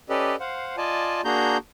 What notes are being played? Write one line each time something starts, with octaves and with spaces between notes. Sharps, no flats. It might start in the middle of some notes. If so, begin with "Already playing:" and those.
C#4 G4 A4 B4 D5 D#5
C5 F5 F#5
F4 D5 D#5 G#5 A5
A#3 D4 F#4 G#4 A#5 G6